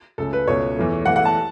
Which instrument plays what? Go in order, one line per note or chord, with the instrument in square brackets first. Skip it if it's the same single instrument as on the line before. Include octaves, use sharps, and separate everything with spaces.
[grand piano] C#2 C#3 A3 A4
B4
C#2 B2 A3 C#5
E2 E3 A3
E2 E3 A3 F#5
F#5
A5